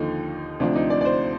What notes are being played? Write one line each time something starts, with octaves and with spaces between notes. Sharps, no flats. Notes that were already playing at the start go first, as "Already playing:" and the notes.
Already playing: D#2 D3 F3 D#4
D2 C3 F3 D4
D#4
D5
D5
C5